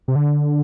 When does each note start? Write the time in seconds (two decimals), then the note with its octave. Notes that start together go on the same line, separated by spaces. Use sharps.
0.08 C3
0.16 D3